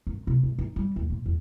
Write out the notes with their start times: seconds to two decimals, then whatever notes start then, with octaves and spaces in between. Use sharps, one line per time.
0.07 F#2
0.27 C3
0.43 G#3
0.58 D#4
0.76 G3
0.96 D#2
1.10 A#2
1.26 E2